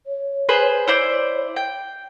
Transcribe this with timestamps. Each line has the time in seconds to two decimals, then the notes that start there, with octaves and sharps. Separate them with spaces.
0.07 C#5
0.49 G#4 B4 C5
0.88 E4 C5 D5
1.56 G5